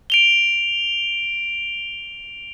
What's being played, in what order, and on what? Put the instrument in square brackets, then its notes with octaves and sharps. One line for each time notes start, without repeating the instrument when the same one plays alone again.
[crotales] D7 F7 G7